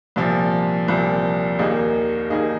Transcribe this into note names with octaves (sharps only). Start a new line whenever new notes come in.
C2 A#2 F3
C2 A#2 F3
D#2 D#3 A#3 D#4 G#4
D#2 D#3 A#3 D#4 G#4